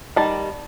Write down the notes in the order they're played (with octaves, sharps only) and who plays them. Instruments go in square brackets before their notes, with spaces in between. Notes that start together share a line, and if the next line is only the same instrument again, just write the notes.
[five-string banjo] D#3 G3 A5